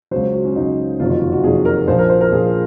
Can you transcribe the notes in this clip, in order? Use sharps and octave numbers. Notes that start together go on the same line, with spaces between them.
C#2 C#3 F#3 C5
F#4
C#4
C#2 C#3 F#3 D#4
F#1 F2 C3 D#3 F#3 F4
F4
F#4
F#4
F#1 F2 C3 D#3 F#3 G#4
A#4
A#1 A#2 F3 C5
A#4
C5
A#4
A#1 A#2 F3 G#4